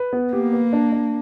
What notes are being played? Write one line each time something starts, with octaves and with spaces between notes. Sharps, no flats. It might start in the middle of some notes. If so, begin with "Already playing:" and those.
Already playing: B4
B3
A#3 G4
B4
D4
D4